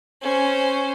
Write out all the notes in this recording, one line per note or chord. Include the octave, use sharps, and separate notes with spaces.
C#4 C5